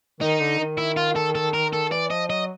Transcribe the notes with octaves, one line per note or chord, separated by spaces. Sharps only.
D#3 D#4
D3
D#3
E4
F4
A4
A4
A#4
A4
E3 D5
F3 D#5
F#3 D#5